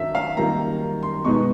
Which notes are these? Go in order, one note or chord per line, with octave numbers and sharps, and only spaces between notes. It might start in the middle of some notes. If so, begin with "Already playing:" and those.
Already playing: F#2 D#3 F#3 D4 E5
F5
D#3 G3 A#3 A#5
C6
B2 G#3 B3 D#4 C#6